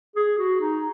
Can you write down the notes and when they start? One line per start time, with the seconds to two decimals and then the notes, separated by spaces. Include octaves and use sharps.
0.16 G#4
0.38 F#4
0.61 D#4